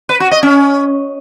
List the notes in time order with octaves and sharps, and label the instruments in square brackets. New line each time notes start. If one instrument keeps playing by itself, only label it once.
[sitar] B4
F#4
D#5
C#4